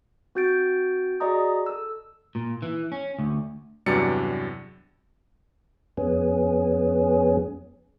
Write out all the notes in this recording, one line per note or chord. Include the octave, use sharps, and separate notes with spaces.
C4 F#4 G6 A6 D7
F#4 G#4 D5 D#5 A#5 D#6
A4 E6
A#2
E3
C#4
D2
E2 G2 C3 F#3 D5 C#7
F2 B3 C#4 G#4